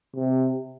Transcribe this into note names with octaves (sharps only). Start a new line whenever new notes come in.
C3